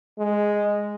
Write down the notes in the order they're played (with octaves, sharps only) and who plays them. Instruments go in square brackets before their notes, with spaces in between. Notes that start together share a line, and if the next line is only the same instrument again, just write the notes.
[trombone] G#3